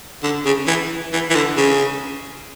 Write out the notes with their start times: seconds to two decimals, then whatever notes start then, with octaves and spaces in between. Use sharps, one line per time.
0.23 D3
0.45 C#3
0.68 E3
1.13 E3
1.30 E3
1.35 D3
1.57 C#3